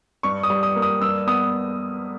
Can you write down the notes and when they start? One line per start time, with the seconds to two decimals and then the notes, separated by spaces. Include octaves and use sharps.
0.23 G2 C#6
0.43 D#6
0.50 G3
0.63 D#6
0.76 A#3
0.82 D#6
1.01 G2 E6
1.27 B3 D#6